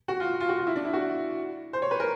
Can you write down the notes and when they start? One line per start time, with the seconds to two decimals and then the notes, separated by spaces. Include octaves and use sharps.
0.08 F#4
0.20 F4
0.40 F4
0.49 F#4
0.58 F4
0.67 E4
0.76 D4
0.85 E4
0.93 F#4
1.73 C5
1.82 C#5
1.91 B4
2.00 A#4